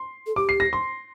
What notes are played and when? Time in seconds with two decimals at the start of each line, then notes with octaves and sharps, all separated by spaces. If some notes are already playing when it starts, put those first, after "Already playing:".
Already playing: C6
0.27 A4
0.36 G4 D6
0.49 C7
0.60 A#6
0.73 C6